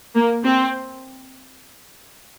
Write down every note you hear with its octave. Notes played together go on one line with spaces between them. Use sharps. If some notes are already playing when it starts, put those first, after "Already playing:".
A#3
C4